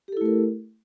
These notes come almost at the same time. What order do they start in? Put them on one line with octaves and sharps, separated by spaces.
G4 A4 E4 A3 A#4